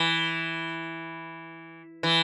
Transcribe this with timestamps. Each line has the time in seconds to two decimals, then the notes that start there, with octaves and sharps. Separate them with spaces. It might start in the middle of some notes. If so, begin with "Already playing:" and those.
Already playing: E3
2.03 E3